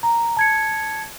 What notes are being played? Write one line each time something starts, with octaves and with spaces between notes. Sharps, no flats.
A#5
A5 G#6 C#7